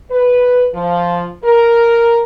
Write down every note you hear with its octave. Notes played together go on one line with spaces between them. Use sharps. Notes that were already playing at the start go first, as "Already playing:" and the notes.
B4
F3
A#4